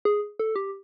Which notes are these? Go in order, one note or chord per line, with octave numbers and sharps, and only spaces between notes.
G#4
A4
G4